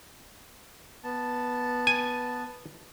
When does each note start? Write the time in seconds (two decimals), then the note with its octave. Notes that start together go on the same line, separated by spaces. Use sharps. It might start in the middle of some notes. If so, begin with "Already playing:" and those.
1.04 B3 A5
1.87 G#5